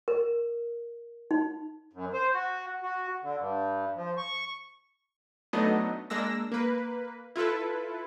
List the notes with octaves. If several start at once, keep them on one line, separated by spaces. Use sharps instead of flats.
A#4
D#4
F#2
C5
F#4
F#4
D3
G2
F3
C#6
F#3 A3 B3 D4 D#4 D#5
G#3 A#3 D4 E6 A#6
A#3 B4
E4 F4 A4 B4